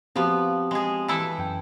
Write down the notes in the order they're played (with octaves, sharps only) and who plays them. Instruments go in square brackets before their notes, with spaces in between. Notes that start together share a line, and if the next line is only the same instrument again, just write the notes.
[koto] F3 B3 [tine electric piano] C4 F#4 G4
[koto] G#3 G#4
E3 E4 A4
[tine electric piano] F#2 G5